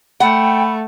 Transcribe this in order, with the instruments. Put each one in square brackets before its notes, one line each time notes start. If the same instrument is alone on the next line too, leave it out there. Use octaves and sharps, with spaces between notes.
[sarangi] A3 [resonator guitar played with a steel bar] F#5 [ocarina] G5 [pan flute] B5